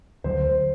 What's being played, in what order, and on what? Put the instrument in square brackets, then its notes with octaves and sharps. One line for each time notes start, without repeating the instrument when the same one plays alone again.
[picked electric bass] D2 D3 F#3 [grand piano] C5